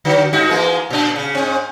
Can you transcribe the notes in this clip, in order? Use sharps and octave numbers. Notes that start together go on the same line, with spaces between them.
D3 F#3
G2 D#4 F#4
E3 G#3 A#3
A#2 D4
C#3
G#2 C4